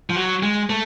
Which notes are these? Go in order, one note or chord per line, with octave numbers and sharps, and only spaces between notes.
F3
F#3
G#3
A3